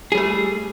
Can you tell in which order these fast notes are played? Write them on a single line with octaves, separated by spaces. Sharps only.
G#4 G3 A3